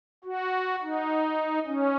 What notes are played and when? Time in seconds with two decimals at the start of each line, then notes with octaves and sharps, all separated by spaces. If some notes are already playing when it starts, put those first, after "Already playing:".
0.25 F#4
0.82 D#4
1.67 C#4